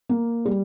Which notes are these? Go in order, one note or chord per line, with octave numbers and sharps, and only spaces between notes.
A#3
G3